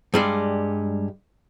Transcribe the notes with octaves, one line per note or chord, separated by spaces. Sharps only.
G2 G3 G#3